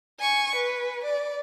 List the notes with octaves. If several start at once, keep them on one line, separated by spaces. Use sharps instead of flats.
G#5 C#6
B4
D5